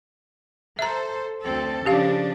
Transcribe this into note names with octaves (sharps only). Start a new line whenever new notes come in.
A4 C5 E5 A#5
D2 C4 A4
C#3 F3 C#4 D4 G4 F5